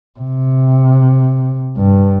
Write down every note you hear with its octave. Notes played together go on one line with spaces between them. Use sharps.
C3
G2